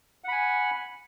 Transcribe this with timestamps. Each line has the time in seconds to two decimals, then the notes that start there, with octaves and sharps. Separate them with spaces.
0.24 F#5
0.28 B5
0.32 G#5